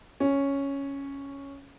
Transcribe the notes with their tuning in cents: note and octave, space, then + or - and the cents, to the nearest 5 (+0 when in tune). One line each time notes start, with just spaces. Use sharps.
C#4 +0